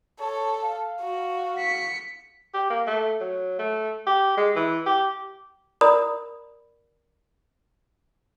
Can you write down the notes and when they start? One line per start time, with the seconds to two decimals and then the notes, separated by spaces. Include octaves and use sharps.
0.20 A4 C#5
0.63 F5
1.01 F#4
1.58 B6 C#7
2.54 G4
2.70 A#3
2.87 A3
3.20 F#3
3.59 A3
4.07 G4
4.37 G#3
4.56 E3
4.86 G4
5.81 A#4 D5 A#5 B5 D#6